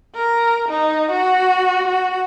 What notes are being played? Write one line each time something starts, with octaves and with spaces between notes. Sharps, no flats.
A#4
D#4
F#4
F#4